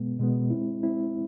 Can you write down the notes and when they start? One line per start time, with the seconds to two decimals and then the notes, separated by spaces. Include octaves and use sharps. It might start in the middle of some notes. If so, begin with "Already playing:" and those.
Already playing: B2 G#3 B3
0.19 B2 G#3 B3
0.50 G#3 C4 E4
0.83 G#3 C4 E4